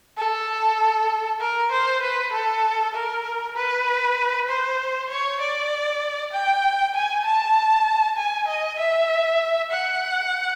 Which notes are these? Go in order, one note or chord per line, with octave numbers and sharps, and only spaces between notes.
A4
A#4
C5
B4
A4
A#4
B4
C5
C#5
D5
G5
G#5
A5
G#5
D#5
E5
F#5